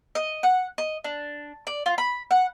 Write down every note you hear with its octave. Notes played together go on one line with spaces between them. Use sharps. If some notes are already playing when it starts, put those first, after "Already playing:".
D#5
F#5
D#5
D4
D5
F4
B5
F#5